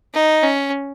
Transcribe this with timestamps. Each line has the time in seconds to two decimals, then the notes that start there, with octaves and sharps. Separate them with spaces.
0.14 D#4
0.43 C#4